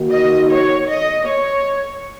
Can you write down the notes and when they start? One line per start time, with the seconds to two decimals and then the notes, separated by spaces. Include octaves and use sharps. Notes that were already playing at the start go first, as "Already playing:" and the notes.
Already playing: D#3 A#3 D#4 F#4
0.11 D#5
0.50 C#5
0.88 D#5
1.26 C#5